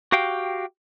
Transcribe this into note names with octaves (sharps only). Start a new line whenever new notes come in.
F#4 G4 F5 G5